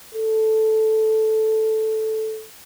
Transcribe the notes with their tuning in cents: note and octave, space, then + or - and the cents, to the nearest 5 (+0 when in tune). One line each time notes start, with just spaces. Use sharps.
A4 -5